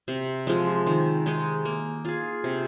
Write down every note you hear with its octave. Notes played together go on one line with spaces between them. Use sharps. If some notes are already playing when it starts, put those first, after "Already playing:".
C3
F3 G#3
D#3
G#3 D#4
A#3
F4 G#4
C3